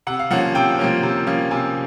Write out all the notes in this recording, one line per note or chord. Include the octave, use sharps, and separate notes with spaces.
C3 F#5
F5
F3 A#3 C#4 F#5
C3 G5
F3 A#3 C#4
C3
F3 A#3 C#4
C3 G#5